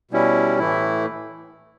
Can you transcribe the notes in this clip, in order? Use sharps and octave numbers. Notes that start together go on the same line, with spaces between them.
B2 G3 C#4 E4
A2 E3 A3 E4